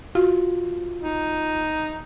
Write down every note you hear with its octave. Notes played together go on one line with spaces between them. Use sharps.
F4 F#4
D#4